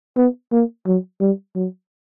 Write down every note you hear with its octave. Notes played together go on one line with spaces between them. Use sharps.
B3
A#3
F#3
G3
F#3